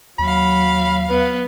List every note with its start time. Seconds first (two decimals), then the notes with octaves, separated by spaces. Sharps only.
0.19 D#2 F#3 F5 B5
1.10 B3 B4